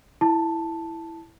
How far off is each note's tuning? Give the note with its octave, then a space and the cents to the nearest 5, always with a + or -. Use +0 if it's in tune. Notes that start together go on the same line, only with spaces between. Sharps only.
E4 +0 A5 +0